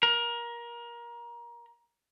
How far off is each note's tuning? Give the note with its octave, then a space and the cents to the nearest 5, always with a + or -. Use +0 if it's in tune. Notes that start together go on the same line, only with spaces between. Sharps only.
A#4 +25